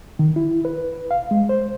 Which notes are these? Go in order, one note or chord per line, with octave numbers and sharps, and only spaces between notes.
D#3
E4
B4
F5
G#3
C5